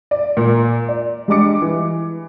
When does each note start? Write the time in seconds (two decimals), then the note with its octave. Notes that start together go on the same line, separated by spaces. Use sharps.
0.11 D5
0.37 A#2
0.89 D5
1.28 G3 G#3 D4 D6 C#7
1.62 E3